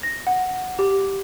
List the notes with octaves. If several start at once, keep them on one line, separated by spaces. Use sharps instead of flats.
A#6
F#5
G4